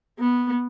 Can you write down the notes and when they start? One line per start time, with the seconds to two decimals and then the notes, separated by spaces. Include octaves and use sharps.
0.19 B3